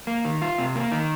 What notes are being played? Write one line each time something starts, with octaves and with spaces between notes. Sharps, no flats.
A#3
D#3
F4
C3
A#3
D#3